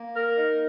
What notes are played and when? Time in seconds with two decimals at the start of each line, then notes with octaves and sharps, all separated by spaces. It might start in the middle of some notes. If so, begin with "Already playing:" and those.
Already playing: A#3
0.15 A#4
0.35 D#4